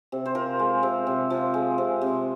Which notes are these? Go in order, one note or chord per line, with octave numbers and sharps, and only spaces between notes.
C3
C5
F3 A#4
G#3
C3
C3
F3
G#3
C3
C3